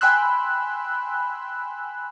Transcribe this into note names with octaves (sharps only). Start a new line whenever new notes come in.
G5 G#5 B5 C6 E6 F#6